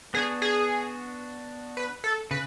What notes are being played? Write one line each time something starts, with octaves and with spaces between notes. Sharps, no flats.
B3 D4 F#4 G#4
G#4
B4
A4
C#3 B4